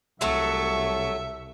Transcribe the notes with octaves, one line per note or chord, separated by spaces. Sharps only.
C2 F#3 A3 E5 A5 C#6